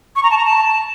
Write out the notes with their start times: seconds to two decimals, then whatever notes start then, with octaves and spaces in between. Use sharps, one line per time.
0.16 C#6
0.23 A#5
0.31 A5
0.37 A#5
0.46 A5